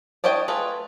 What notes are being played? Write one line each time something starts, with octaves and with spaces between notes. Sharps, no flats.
D4 E4 C#5 D#5 G5
A3 F4 G#4 B4